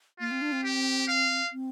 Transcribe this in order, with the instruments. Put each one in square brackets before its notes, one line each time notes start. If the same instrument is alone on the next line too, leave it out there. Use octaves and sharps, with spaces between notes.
[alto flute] A#3 [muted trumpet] F4
[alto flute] C4
D4
C4
[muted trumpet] G4
F5
[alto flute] C4